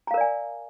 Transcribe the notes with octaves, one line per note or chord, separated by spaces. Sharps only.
A#4 D5 F5 G#5 A#5